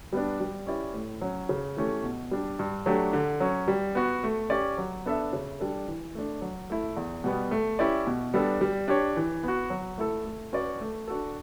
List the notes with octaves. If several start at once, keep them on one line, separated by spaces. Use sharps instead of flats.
G3 B3 D4
G3
C#4 E4 G4 D5
A2
F#3 C#4
C#3
E3 A3 C#4 G4
B2
G3 D4
G2
F#3 A3 D4 G4
D3
F#3 C#4
G3
B3 F#4
A3
C#4 G4 D5
F#3
B3 D4 A4 E5
C#3
G3 D4 A4
E3
A3 D4
F#3
A3 E4
E2
B2 G3 B3
A3
C#4 E4 G4 D5
B2
G3 B3 D4 A4
G3
D4 G4 C#5
E3
B3 F#4
F#3
A3 E4 A4
A3
C#4 F#4 B4 D5
A3
D4 F#4 A4